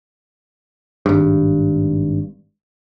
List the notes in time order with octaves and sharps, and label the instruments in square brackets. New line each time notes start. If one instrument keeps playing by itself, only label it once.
[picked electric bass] G#1 G2